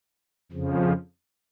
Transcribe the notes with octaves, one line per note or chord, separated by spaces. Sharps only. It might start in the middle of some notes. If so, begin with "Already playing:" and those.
F2 C#3 F3